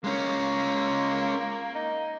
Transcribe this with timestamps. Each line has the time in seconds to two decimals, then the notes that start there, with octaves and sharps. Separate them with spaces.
0.04 G#3 A#3 C#4
1.75 D#4